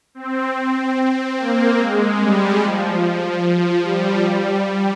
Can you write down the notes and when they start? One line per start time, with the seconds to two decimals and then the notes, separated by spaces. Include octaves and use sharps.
0.15 C4
1.38 A#3
1.79 G#3
2.20 G3
2.61 F3
3.42 F3
3.83 G3
4.24 G3